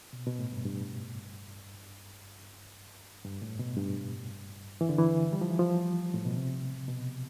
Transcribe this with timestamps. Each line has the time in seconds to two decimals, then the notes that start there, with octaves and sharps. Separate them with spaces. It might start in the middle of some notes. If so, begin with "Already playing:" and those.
0.13 B2
0.26 B2
0.39 A2
0.52 G2
0.65 G2
3.25 G2
3.42 A2
3.59 B2
3.77 G2
4.81 E3
4.89 D3
4.98 E3
5.33 G3
5.41 F3
5.51 E3
5.59 F3
6.14 A2
6.25 B2
6.37 C3
6.88 B2